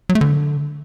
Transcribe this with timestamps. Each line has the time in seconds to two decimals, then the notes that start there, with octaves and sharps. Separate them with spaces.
0.09 F#3
0.15 A3
0.21 D3